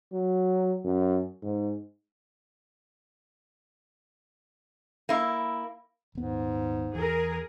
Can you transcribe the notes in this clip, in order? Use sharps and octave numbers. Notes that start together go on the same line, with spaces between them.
F#3
F#2
G#2
A#3 E4
D#1 G#2 B3
E2 G#4 A#4